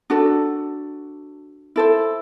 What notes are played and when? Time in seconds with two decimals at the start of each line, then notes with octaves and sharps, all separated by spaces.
0.10 D4 F#4 A4
1.76 E4 A4 C5